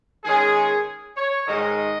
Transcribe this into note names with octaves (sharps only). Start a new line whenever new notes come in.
D#3 G#3 C#4 G#4
C#5
G#2 D#3 G#3 D#5